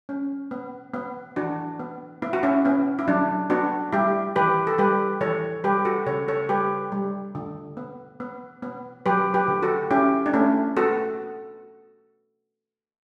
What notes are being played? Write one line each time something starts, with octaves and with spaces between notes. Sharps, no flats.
C#4
B3
B3
E3 D4 F#4
B3
B3 E4
F#4
C#4 E4
B3 C#4
E4
F#3 D4
B3 D4 F#4
G3 E4 G4
E3 G4 B4
A4
G3 G4 B4
E3 A4 C#5
G3 G4 B4
F#4 A4
C#3 A4 C#5
A4 C#5
G3 G4 B4
G3
D3
B3
B3
B3
F#3 G4 B4
G4 B4
D3
F#4 A4
C#4 E4 G4
D4
A3 C#4 E4
B3 F#4 A4